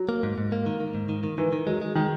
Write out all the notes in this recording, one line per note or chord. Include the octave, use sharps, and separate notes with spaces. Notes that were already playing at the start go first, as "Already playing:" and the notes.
Already playing: F#3
A#3
G#2
G#2
A#3
D#3
D#3
G#2
D#3
D#3
D#3 E3
D#3
F#3 G#3
G#3
D#3 G#3